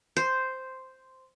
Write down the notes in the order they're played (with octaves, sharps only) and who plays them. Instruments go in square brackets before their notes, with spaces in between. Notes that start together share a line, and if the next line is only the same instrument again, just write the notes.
[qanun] C5